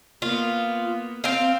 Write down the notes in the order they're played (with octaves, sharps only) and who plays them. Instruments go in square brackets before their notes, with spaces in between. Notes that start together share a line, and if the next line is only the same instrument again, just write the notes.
[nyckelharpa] A#3 B3 [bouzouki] F4
[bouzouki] C4 F5